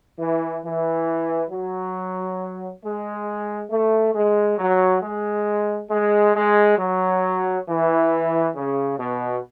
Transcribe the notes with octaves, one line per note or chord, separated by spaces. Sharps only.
E3
E3
F#3
G#3
A3
G#3
F#3
G#3
G#3
G#3
F#3
E3
C#3
B2